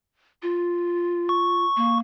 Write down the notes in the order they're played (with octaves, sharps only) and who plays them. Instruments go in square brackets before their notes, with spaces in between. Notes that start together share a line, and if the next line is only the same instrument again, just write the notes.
[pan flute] F4
[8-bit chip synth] C#6
[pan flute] A#3